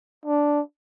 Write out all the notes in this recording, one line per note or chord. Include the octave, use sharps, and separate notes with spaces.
D4